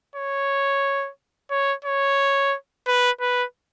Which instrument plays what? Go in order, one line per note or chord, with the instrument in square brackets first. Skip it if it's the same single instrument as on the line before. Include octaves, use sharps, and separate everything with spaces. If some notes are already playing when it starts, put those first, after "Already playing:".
[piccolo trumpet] C#5
C#5
C#5
B4
B4